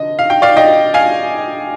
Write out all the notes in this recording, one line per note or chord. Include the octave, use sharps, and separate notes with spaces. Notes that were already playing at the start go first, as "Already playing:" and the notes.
Already playing: F1 D3 D#5
F5
G5
D5 F5
D#5 G5
F5 G#5